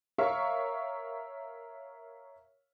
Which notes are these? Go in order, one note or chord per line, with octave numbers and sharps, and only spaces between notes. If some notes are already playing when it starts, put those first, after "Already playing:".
A#4 C#5 E5 F5 C#6